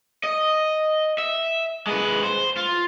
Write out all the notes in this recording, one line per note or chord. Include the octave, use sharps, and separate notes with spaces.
D#5
E5
G#3 B4
C5
F4